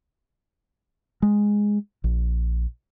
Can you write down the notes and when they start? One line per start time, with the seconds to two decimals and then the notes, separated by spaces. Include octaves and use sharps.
1.22 G#3
2.04 A#1